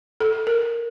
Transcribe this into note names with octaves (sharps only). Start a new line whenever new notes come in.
A4
A#4